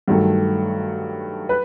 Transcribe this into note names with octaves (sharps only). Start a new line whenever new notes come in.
G2 D#3 F#3 A3
B4